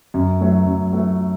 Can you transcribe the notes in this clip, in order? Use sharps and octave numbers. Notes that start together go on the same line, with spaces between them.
F#2
F#3 A3
F#2
F#3 A3